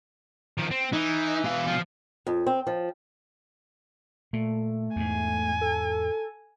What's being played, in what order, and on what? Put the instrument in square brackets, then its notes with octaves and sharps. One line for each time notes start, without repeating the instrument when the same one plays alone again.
[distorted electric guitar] D#3 F3
C4
[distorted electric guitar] E3 [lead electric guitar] D#4
[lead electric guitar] B2 F5
[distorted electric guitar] F3
[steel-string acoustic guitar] F2
C4
F3
[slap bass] A#2 [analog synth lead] A3
[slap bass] E2 G#2 [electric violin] G#5
[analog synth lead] A4